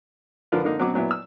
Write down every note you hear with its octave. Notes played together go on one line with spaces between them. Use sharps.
D3 F3 F4 A#4 B4
D3 A#3 D#4
B2 F#3 C4 C#4 F#4 D6
A#2 F#3 B3 E4
E6